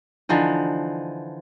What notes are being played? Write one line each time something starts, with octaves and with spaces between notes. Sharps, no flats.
D3 E3 F3 D#4